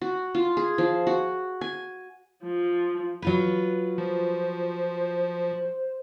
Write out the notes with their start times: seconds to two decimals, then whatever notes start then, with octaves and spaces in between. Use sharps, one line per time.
0.01 F#4
0.35 F4
0.57 G#4
0.78 F3
1.07 F#4
1.61 G#5
2.43 F3
3.22 F#3 F4 B4
3.98 F3 C5